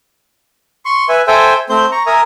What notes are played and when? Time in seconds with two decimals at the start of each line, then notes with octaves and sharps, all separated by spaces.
0.85 C6 C#6
1.09 B4 E5 G#5
1.27 A4 C5 E5 G5 G#5
1.69 A3 C4 C5 G6
1.92 A#5 C#6
2.06 A#4 E5 G#5 A#5 D#6